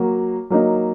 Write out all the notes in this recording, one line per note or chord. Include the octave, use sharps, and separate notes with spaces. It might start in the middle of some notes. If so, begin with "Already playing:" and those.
Already playing: F#3 A#3 F#4
F#3 A#3 D#4